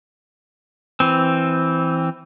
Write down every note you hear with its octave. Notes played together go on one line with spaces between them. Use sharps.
E3 C4